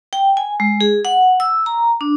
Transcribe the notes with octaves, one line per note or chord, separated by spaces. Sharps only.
G5
G#5
G#3
G#4
F#5
E6
A#5
D4